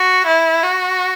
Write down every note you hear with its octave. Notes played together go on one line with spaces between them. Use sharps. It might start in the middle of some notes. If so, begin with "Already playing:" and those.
Already playing: F#4
E4
F#4